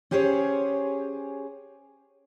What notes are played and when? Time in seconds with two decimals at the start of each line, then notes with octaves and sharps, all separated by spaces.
0.11 C#4 G4 G#4 C5 C#5